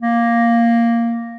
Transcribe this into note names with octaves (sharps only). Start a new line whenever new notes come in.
A#3